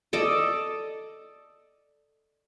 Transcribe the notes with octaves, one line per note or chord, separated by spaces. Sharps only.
A4 D5 D#5